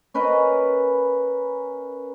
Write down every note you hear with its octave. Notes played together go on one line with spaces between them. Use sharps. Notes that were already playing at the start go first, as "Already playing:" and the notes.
C#4 A#4 B4 D#5